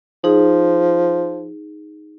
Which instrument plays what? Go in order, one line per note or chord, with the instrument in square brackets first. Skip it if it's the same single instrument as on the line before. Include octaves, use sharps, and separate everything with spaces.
[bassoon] F3 [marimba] D#4 G#4